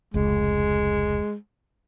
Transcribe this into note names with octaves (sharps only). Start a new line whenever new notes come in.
F1 C#2 G#3